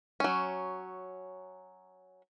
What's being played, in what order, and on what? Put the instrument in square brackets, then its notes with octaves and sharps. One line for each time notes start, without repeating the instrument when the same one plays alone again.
[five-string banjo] F#3 C#4